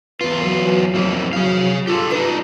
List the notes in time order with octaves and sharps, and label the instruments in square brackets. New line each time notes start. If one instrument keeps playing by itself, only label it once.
[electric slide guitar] E2 F4 [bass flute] B4
[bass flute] F#3
[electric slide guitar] F2 E3 A#3
[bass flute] F#3 [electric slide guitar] G#4 F5
[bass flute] F4 [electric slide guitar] G4 A4
[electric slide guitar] D4 D#4 [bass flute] B4